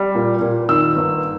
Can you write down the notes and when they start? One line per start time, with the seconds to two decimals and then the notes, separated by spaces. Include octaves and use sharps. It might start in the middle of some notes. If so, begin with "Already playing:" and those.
Already playing: G3
0.15 A#2
0.41 A#2
0.69 D#3 E6
0.96 G1